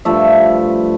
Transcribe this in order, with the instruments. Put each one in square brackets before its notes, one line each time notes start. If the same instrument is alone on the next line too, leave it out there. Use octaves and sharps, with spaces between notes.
[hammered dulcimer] G2 F3 A3 E5